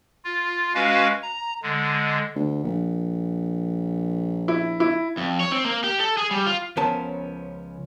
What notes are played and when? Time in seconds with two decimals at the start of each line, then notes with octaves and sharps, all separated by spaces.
0.25 F4
0.75 G#3 C#4 F#4 B4 F5
1.22 A#5
1.63 D3 G#3
2.35 D2
2.63 A#1
4.48 E4
4.80 E4
5.17 F2
5.40 C#5
5.52 C4
5.65 A#3
5.84 G4
5.99 A4
6.17 G#4
6.31 G3
6.46 F4
6.77 C#2 F3 B3 C#4 A#4 A5